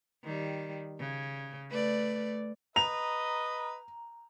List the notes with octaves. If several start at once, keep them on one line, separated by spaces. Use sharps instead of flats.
D#3 G3
C#3
A3 B4 D5
B4 D#5 A#5 F7